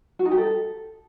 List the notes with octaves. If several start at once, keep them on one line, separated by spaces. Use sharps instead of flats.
F#4
D#4
G4
A4